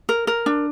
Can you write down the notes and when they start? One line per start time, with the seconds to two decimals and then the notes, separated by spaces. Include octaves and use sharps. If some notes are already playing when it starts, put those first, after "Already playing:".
0.09 A#4
0.27 A#4
0.46 D4